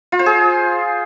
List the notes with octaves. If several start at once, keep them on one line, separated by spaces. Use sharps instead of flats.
F4
C5
G#4